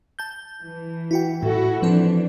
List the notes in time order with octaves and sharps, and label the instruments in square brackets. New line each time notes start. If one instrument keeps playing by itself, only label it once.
[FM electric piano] A5 G6
[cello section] E3
[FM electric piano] E4 F#4 G5
[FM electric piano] A2 [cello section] E4 F#4 A4
[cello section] E3 D4 [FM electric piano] F3 C4 A4